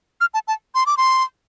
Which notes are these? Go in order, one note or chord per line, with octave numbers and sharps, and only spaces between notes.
F6
A5
A5
C6
D6
C6